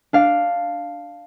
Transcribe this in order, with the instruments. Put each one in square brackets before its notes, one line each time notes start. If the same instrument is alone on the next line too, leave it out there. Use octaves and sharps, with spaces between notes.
[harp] D4 F5